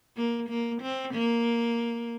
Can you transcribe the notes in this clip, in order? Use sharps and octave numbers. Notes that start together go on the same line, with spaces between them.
A#3
A#3
C4
A#3